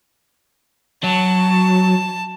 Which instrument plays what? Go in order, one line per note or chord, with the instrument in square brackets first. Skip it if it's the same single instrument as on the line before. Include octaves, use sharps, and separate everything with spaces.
[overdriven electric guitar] F#3 [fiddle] A5